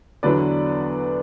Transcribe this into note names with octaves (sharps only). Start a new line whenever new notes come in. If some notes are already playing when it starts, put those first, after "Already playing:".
E2 D3 F#3 B3 D4 B4 D5